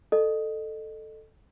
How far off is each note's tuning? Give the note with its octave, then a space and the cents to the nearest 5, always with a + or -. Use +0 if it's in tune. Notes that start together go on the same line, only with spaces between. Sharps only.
A4 +0 D#5 -30